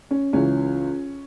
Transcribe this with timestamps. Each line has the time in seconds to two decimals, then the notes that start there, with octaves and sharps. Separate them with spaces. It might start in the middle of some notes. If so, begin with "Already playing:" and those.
0.11 C#4
0.33 C#2 C#3 E3 C#4